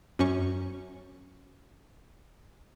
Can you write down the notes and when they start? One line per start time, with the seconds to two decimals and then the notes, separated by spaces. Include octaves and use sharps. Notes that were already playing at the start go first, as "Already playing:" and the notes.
0.19 F#2 C#4 C#6